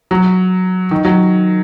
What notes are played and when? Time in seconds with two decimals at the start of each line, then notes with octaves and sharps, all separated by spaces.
0.11 F#3
0.91 D#3
1.05 F#3